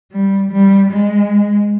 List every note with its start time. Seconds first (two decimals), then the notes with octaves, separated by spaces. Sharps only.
0.12 G3
0.52 G3
0.91 G#3